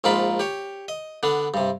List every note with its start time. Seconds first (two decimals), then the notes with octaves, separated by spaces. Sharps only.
0.04 A#1 G#2 F4 A#4 A5 B5
0.39 G4 C#5
0.88 D#5
1.23 D3 B3 D4
1.54 G2 C3